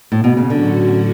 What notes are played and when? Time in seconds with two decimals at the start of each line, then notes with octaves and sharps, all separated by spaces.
0.12 A2
0.24 B2
0.37 C#3
0.50 A2 D3 F#3 C#4 F#4